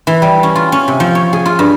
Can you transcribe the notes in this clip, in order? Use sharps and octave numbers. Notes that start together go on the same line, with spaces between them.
E3
G3
C#4
F4
C#4
C3
F3
C#5
G#4
F4
G2